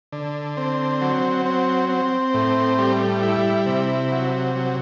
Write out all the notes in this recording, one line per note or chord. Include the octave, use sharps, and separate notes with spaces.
D3
C4
F#3
C4
C4
A2
G3
E4
C3
F#3
F#3